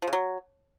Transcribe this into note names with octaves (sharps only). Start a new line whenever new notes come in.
F3
C#3
F#3